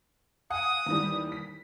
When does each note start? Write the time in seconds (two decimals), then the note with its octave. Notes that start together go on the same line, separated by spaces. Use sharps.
0.50 F5 F#5 G#5 D#6
0.86 D#2 E3 G3
1.32 B6